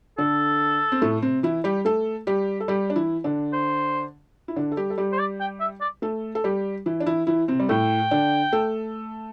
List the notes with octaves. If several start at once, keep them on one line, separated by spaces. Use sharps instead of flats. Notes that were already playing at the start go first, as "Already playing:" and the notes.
D3 D4 A4
C4
A2 A3
C3 C4
E3 E4
G3 G4
A3 A4
G3 G4
A4
G3 G4
D4
E3 E4
D3 D4
C5
E4
D3 D4
A4
G3 G4
A4
G3 G4
C5
D5
G5
E5
D5
A3 A4
A4
G3 G4
E3 E4
D4
E3 E4
E3 E4
C3 C4
G3
A2 A3 G5
D3 D4
A3 A4